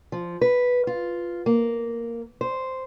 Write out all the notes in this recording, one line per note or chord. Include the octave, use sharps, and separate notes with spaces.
F3
B4
F4
A#3
C5